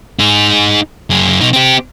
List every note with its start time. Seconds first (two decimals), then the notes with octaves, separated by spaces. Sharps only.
0.19 D#4 G#4
1.10 F#2 G#4
1.41 B2 D#4
1.53 C4 G4